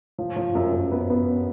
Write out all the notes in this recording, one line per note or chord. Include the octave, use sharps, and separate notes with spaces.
F3
F3
F#2
F#2
B3
B3